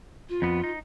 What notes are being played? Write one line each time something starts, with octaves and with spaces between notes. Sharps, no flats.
F4
F2 B3
D#4